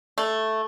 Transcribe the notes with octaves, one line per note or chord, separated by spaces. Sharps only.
A3